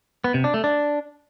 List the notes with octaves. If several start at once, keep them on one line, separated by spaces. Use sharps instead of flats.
B3
C3
D4
A3
D4